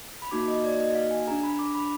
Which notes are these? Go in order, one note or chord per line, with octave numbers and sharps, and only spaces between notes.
B5
A#3 D#4 F#4 D6
D#5
D5
D#5
F5
G#5
D4 G#4 A#5
B5
D6
B5